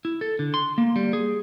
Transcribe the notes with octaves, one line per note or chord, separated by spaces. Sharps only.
E4
A4
D3
C6
A#3
G3
G#4